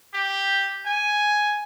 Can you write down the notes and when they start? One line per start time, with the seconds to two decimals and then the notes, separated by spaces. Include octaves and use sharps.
0.14 G4
0.86 G#5